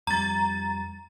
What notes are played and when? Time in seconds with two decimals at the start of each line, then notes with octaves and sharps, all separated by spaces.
0.07 F2 G3 A#5 A6